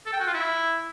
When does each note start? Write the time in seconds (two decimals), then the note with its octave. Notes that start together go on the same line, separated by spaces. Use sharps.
0.06 A4
0.13 G5
0.20 F#4
0.27 F4
0.34 E4